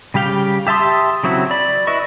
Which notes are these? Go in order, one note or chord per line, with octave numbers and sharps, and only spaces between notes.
C#3 G3 G4 F5 G5
G4 E5 A5 C6 D#6
C#3 F#3 C4 E4 F#4
D5 B5
E4 B4 D#5 C#6